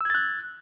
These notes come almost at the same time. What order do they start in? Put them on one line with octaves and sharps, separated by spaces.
E6 G#6 A6 F#6